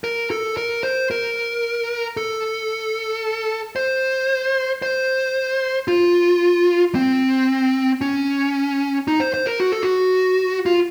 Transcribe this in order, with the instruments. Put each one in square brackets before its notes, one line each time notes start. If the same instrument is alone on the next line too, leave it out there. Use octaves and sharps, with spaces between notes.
[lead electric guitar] A#4
A4
A#4
C5
A#4
A4
C5
C5
F4
C4
C#4
D#4
C5
C5
A#4
F#4
A4
F#4
F4